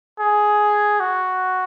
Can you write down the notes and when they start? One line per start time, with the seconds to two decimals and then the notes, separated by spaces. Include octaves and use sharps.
0.19 G#4
1.00 F#4